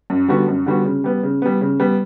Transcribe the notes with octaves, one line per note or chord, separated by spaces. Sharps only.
F#2
D3 G3 B3 F#4
F#2
D3 G3 B3 F#4
C#3
G3 B3
C#3
G3 B3
C#3
G3 B3